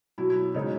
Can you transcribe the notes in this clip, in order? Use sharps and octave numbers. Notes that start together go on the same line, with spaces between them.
B2 F#3 E4
E4
C#3 G#3 D#4